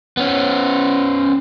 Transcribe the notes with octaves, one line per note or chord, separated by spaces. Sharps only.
B3 C#4